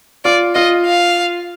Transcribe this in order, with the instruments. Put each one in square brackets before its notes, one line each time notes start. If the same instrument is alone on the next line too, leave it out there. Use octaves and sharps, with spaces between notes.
[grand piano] F4 [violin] D5
[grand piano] F4 [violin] D#5
[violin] F5